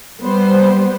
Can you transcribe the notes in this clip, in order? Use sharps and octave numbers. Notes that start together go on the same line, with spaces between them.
G3 B3 C5